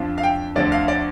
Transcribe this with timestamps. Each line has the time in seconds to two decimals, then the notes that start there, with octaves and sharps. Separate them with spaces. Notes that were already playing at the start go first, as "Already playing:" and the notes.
Already playing: F2 F3 D4 F4
0.18 F5
0.23 G5
0.56 D2 D3 F3 C4 D5
0.72 F5
0.88 D5